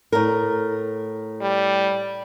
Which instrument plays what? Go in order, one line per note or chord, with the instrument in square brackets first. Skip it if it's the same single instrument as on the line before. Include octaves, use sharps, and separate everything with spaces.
[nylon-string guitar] A2 A#4
[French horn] G3